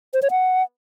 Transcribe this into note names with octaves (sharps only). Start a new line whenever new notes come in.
C5
C#5
F#5